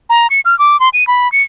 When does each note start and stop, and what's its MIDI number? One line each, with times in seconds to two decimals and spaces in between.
0.10 0.27 82
0.30 0.40 97
0.45 0.57 89
0.59 0.79 86
0.80 0.89 84
0.94 1.07 99
1.07 1.30 83
1.32 1.42 97